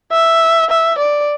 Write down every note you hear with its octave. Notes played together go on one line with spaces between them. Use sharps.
E5
E5
D5